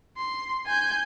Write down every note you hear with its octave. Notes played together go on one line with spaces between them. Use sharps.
C6
G#5 G6